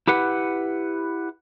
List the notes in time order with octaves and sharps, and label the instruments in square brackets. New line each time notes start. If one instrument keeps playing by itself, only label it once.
[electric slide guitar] E4 G4 B4 F#5